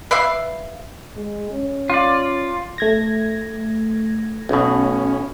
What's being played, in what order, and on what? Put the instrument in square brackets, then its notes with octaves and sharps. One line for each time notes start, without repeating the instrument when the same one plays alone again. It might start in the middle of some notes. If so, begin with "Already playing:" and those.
[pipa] B4 D5 E5 F5
[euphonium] G#3
C#4
[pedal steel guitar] F4 D5
[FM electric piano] A3 G#6 A#6
[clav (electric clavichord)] B1 B2 [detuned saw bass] C#4